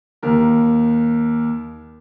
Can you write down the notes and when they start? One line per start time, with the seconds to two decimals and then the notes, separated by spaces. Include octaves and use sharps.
0.23 D#2 A#4